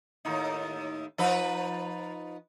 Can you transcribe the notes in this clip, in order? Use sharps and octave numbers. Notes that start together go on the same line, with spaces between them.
D#2 A2 D#4
F3 D#4 B4